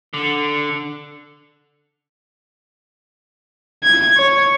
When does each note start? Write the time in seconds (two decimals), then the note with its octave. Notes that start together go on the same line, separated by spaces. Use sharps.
0.14 D3
3.83 G#6
4.17 C#5